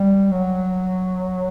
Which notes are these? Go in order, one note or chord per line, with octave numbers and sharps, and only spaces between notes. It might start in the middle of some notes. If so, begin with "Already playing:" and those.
Already playing: G3
F#3